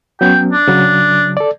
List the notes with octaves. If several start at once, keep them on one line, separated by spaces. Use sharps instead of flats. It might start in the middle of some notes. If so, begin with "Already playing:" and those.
F#3 B3 C#4 G5
D4
C#3 F#3
A4 D5